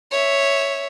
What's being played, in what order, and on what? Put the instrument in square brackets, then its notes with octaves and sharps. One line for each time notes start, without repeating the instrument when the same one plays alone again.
[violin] C#5 E5